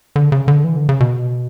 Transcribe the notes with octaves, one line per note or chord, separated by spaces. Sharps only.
D3
C#3
D3
E3
D3
C#3
B2